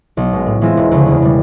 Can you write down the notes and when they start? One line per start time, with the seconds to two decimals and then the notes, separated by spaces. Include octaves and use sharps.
0.17 B1
0.33 B2 G#3
0.47 A2
0.61 E3 G#3 C4 F4
0.77 E1
0.91 D2 C#3 F3
1.06 E2
1.22 B2 G3